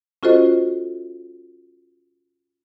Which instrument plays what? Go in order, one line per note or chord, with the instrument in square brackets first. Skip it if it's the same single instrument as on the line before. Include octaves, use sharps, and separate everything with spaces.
[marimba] C#4 F4 F#4 A4 C5 D#5